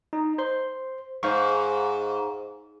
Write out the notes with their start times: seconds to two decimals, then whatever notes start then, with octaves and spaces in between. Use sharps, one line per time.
0.13 D#4
0.38 C5 C6
1.23 G#2 C5 F5 C#6